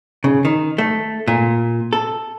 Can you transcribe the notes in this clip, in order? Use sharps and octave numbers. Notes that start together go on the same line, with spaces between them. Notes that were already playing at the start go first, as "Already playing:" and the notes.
C#3
D#3
A3
A#2
A4